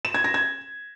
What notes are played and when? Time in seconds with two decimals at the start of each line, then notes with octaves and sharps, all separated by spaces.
0.05 E7
0.14 G#6
0.24 A#6
0.34 G#6